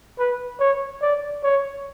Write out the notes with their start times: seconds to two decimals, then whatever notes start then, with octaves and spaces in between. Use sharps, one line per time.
0.19 B4
0.60 C#5
1.02 D5
1.44 C#5